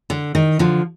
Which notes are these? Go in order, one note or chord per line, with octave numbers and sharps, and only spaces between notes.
D3
D#3
D3 F3